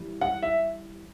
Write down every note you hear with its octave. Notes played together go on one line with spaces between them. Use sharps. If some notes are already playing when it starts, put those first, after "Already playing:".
Already playing: E3 G3
F#5
E5